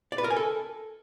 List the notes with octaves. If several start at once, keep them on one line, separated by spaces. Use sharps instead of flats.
D5
B4
A#4
G#5
A4